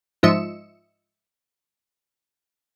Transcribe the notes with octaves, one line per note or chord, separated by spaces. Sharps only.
G#2 F3 D#5 E5 C#7 E7